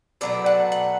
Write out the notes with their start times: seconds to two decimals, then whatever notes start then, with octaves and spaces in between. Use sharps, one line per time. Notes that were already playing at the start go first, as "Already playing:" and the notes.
0.21 B2 F#3 A3 D5
0.46 F#5
0.72 F#5